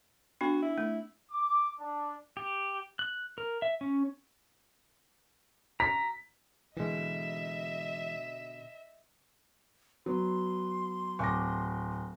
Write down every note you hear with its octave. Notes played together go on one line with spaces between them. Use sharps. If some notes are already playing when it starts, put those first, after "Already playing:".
B3 D4 F#4
E4
A3
D6
D4
G4
F#6
A#4
E5
C#4
A#5 B6
B2 D3 E3 G#3 D#5 E5
F#3 B3 C6
D1 C#6 D6 A#6